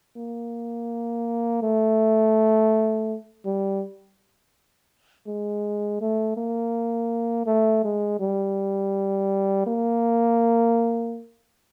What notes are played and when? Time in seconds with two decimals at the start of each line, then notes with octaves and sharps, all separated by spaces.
0.17 A#3
1.63 A3
3.45 G3
5.27 G#3
6.01 A3
6.37 A#3
7.47 A3
7.84 G#3
8.20 G3
9.67 A#3